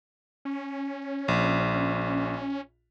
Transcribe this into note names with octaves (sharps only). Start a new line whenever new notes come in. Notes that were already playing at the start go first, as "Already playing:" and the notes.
C#4
A#1